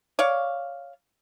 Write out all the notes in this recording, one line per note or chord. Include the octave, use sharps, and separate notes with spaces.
C#5 D5 F5